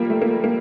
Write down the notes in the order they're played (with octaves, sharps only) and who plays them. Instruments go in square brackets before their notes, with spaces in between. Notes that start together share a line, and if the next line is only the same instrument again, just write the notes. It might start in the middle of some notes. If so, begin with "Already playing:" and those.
Already playing: [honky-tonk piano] F3 G3 A#3
A3
A#3
A#3